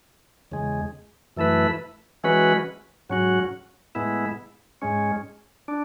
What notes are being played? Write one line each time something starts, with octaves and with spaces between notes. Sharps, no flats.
E2 C#3 G#3
F#2 E3 A3 E4 B4
E3 G#3 C#4 F#4 B4
G#2 F#3 C#4 F#4
A2 G#3 B3 E4
G#2 G#3 C#4
D4